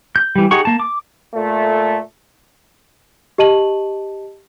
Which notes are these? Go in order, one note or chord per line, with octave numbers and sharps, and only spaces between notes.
G6
E3 G3
D#4 G4 G#4 F#5 C#6
A#3 A5
D6
A#2 A3
G4 D#5 A5 D#7 F#7